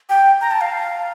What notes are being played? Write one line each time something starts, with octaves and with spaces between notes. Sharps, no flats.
G5
A#5
A5
F5